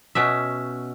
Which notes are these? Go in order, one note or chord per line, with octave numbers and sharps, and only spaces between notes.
B2 C#4 E5